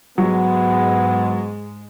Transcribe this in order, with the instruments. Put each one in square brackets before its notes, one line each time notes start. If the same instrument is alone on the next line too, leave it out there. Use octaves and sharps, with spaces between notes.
[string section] G#2 G#3 [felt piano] F#3 [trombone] B3